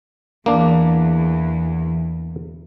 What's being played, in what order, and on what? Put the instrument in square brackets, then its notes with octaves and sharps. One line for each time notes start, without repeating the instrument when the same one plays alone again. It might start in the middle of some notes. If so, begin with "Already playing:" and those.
[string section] E2 [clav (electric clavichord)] A#3 D4